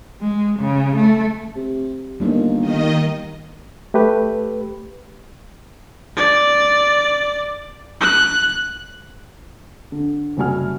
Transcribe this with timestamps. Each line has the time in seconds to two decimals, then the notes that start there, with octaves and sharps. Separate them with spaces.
0.21 G#3
0.60 C#3
0.96 A3
1.56 C3
2.20 G1 G3 A#3 D#4
2.58 D#3 D#5
3.94 A3 G4 B4
6.17 D5
8.01 F#6
9.92 D3
10.37 F#1 C3 G3 F#4 G#5 F6